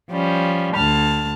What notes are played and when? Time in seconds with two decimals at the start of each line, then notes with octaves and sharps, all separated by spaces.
0.11 F3 G3 C#4
0.76 D2 A5 F6